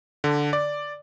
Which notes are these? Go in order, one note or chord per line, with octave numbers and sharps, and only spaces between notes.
D3
D5